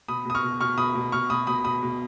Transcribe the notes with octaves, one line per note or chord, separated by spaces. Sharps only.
B2 B5 D#6
B2 D#6
C#6 F6
B2
B2 C#6 F6
B2 B5 D#6
B2
B2 C#6 F6
B2 B5 D#6
B2 B5 D#6
B2 B5 D#6
B2